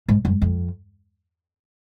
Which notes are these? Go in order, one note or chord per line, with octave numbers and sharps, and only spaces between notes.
G#2
F#2
F2